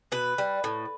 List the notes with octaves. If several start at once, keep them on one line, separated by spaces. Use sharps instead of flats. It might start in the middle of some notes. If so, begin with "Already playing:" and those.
B2 B4
G3
A2